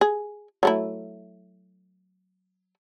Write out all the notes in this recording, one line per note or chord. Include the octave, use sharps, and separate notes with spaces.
G#4
F#3 A3 E4